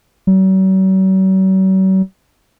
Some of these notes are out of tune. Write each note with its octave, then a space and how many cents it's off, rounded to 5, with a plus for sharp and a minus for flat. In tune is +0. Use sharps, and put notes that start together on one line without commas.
F#3 +45